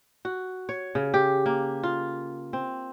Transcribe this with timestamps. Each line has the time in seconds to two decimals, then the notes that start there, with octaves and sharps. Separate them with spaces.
0.25 F#4
0.69 C#5
0.95 C#3
1.14 G4
1.46 A#3
1.83 F4
2.53 C4